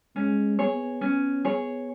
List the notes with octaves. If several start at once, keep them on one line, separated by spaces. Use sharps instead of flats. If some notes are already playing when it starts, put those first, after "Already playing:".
G#3 C#4
B3 G#4 C#5
C#4
G#4 C#5